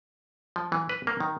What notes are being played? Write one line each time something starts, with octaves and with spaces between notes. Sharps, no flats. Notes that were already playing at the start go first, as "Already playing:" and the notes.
F3
E3
B4
A#3
D#3